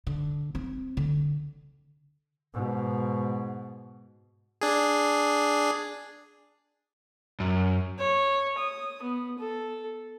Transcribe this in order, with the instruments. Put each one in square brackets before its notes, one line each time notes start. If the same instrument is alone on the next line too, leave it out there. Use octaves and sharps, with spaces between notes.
[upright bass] D3
C4
D3
[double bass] G#2 B2
[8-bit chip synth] D4 G#4
[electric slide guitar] F#2
[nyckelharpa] C#5
D#6
B3
A4